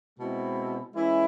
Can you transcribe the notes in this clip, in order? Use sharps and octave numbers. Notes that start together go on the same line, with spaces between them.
B2 G#3 C4 E4
E3 G#3 C#4 E4